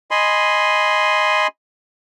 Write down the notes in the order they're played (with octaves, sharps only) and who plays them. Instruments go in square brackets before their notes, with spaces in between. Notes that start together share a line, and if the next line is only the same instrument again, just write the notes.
[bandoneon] D#5 G#5 B5 C6